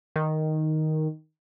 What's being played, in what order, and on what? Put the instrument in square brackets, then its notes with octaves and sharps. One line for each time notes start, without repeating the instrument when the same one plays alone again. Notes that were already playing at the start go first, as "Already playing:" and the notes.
[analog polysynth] D#3